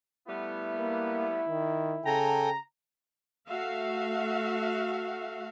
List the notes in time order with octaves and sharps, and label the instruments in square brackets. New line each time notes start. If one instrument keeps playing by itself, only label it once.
[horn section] G3 A3 B3 [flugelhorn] E4
[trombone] A#3
D#3
[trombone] C#3 [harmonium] A4 G5 G#5 [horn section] A#5
[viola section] A3 F#4 E5 F5